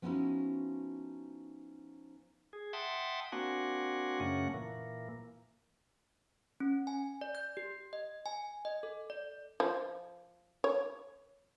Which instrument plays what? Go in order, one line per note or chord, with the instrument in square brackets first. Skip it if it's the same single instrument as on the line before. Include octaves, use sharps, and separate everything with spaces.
[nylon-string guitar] F3 B3 C#4 D#4 E4 F#4
[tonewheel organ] G#4
E5 F#5 G5 A5 C6 D#6
A#3 C4 D4 F#4 F#5 G#5
F#2 C#3 A3 A#3 C#4 F#5
A#2 E3 A#3
[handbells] C#4
G#5
D5
G6
G4
D#5
G#5
D#5
A4
D5
[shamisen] F3
C#5